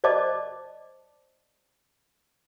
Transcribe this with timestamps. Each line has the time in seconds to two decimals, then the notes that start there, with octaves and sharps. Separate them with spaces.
0.04 C5 D5 D#5 A5 D6